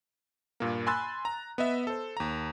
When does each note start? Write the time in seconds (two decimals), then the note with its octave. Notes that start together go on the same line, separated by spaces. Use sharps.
0.60 G2 A#2 A#3
0.87 G#5 B5 C6 E6 F#6 A6
1.25 A#5
1.58 B3 D#5 E5
1.87 A4 C5
2.17 D#2 A#5